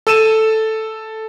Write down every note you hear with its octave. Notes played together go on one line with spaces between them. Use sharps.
A4 E6 D#7 E7